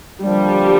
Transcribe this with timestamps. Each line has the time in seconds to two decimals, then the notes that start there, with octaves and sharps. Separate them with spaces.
0.23 D3 F3 G3 A#3 D4